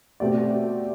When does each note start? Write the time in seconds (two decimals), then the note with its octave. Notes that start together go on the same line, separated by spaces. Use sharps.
0.20 B2 A3 C4 G4 D5